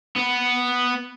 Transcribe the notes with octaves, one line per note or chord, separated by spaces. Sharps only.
B3